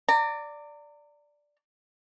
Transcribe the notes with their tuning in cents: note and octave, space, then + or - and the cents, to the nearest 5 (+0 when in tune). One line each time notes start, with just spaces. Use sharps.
D5 +0 A#5 -35